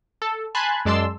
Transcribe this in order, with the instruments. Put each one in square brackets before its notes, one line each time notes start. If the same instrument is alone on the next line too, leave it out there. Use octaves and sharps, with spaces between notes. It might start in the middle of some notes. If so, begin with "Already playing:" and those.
[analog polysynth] A4
G#5 A5 B5 C6 F#6 G#6
F#2 G#3 D5 A5 C6 E6